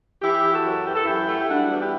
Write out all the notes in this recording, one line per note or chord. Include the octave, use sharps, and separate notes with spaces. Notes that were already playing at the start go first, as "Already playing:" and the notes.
E3 E4 G4
E3
F#4 A4
F#2
E3 G4
A4
F#2 E4 G4
A3
G4
G3 D4 F#4
E2
E4 G4